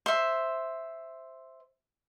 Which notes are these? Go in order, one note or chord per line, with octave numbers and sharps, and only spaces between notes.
C5 E5